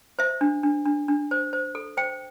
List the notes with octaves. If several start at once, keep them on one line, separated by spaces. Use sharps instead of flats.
C5 E5
D4
D4
D4
D4
C5
C5
A4
C5 G5